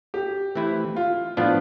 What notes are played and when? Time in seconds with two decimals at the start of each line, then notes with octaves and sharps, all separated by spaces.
0.14 G4
0.55 E3 A3 C4 E4 B4
0.96 F4
1.37 A2 F3 B3 D4 F4